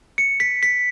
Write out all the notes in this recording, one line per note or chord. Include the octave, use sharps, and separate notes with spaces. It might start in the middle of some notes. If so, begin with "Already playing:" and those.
C#7
B6
B6